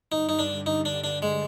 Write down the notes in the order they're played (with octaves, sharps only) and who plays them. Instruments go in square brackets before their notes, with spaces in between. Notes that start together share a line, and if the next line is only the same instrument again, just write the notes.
[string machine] G2 D3 G3 [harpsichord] D#4
[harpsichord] D#4
D4
D#4
D4
D4
G#3